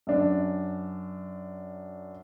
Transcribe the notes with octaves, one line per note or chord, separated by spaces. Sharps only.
F#2 D4